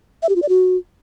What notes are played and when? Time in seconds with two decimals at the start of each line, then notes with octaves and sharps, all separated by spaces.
0.23 E5
0.29 G4
0.36 F4
0.42 D5
0.49 F#4